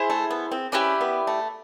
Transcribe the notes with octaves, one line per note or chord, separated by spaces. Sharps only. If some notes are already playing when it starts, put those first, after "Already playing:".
Already playing: E4 G#4 C5
A3
B3
C4
C#4 E4 G4 B4 D5
B3
A3